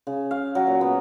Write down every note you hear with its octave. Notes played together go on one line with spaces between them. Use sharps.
C#3
F5
F#3
A#2
B3